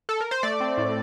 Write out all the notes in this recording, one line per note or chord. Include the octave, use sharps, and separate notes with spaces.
A4
A#4
C5
A3 D5
C4
A2